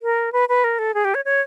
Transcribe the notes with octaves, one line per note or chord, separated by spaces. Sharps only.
A#4
B4
B4
A#4
A4
G#4
G4
C#5
C#5